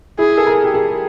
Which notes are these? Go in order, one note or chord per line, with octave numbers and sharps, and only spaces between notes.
E4 G#4
A4
A#4
G4
G#4